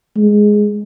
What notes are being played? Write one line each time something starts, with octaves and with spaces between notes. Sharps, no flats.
G#3